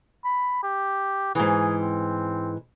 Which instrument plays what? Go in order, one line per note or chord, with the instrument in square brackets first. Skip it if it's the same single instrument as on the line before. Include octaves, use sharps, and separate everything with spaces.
[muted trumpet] B5
G4
[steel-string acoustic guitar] G#2 E3 [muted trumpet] G#4
[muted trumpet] C4